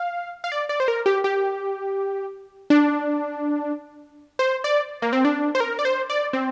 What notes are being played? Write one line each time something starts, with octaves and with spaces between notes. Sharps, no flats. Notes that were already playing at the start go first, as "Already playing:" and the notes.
Already playing: F5
F5
D5
D5
C5
A#4
G4
G4
D4
C5
D5
A#3
C4
D4
C5
A#4
D5
C5
D5
C4